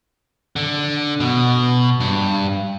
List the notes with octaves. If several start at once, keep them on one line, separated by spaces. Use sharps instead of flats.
D3
B2
G2